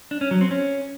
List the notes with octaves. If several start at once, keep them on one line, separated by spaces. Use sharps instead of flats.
D4
C#4
F#3
C4
C#4